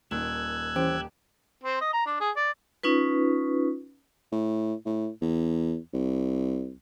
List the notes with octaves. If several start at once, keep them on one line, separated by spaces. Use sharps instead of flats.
D#1 D#3 E6 F#6 G#6
E3 C#4 G4 C5
C4
D#5
A#5
D4
G#4
D5
C#4 D#4 F4 B4
A2
A2
E2
C2